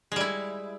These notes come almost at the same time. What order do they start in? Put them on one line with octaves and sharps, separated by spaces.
G#3 G3 E4